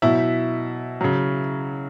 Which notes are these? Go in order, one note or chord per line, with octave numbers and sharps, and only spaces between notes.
B2 F#3 E4 E5
C#3 F#3